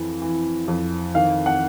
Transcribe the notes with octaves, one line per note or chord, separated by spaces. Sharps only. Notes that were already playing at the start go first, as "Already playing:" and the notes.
Already playing: F2 E3
E3
F2
D#3 F5
F#5